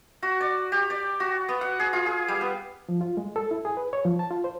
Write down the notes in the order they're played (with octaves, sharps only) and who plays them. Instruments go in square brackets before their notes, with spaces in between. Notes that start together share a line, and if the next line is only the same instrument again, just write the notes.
[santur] F#4
D5
G4
D5
F#4
B3
F#5
G#4
F4
G#4
G3
B3
[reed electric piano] F3
F4
G#3
A4
E4
G#4
B4
C#5
F3
A5
F4
C5